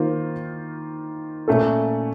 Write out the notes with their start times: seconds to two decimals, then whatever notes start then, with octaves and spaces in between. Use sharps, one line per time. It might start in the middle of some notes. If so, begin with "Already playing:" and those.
Already playing: D#3 A#3 F4 C5
1.48 A#2 A3 C#4 A4